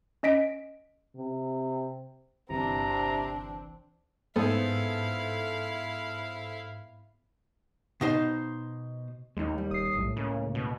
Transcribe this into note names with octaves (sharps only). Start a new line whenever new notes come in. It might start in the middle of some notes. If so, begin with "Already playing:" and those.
C#4 D#5 B6 D7
C3
G1 C2 C3 E3 C4 D4 A#5
G#2 B3 E4 G#4 A4 C5 F5
B2 D#4 C5
D#2 G#3 D#4
G3
D#1 D#6 C7
B1 A2
C#2 C#3 A#3
B2